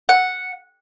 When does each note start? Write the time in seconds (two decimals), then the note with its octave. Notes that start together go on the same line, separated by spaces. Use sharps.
0.09 F#5